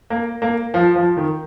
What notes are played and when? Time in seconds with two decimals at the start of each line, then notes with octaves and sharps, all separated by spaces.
0.10 A#3
0.42 A#3
0.74 F3
0.96 F3
1.17 D#3